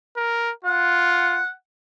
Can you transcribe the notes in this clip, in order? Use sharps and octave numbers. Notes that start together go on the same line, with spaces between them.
A#4
F4 F#5